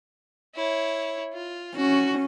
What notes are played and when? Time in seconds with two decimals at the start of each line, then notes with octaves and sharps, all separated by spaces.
0.55 E4 C#5
1.33 F4
1.77 C#4 F#4